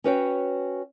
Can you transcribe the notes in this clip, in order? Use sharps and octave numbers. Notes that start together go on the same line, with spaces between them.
C#4 F#4 B4 C#5 E5 G5